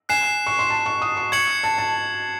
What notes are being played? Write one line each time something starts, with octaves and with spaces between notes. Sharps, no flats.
G#5 F#6 C7 E7
C#6
C6
A5
C#6
D#6
C#6
C#6 G#6 C#7 F#7
A5
A5